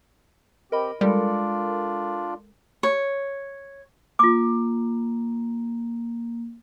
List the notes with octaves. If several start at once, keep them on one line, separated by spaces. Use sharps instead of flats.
C4 G4 A#4 D#5 B5
G3 G#3 D4 F4 A4 A#4 D5
C#5
A#3 F4 D6